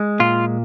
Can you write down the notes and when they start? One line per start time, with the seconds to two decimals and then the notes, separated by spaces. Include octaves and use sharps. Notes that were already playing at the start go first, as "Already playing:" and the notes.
Already playing: G#3
0.20 A#2 F4